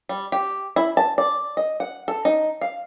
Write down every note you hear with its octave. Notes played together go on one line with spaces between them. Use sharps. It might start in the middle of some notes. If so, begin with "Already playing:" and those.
G3
G4
E4
A5
D5
D#5
F#5
A4
D#4
F5